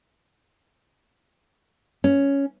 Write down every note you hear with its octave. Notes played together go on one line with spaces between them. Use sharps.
C#4